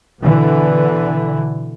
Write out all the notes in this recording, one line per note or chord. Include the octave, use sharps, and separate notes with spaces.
B2 D3 E3